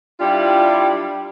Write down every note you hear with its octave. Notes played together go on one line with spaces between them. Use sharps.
G3 D4 E4 F4 G4